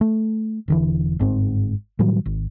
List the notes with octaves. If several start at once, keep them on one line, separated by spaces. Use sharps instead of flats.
A3
E1 D3 E3
G1 G#2 C4
A2 D#3 F#3 G3
G#1